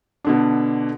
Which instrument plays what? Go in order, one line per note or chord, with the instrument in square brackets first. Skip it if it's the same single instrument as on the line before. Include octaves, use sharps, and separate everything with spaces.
[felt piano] B2 D3 D4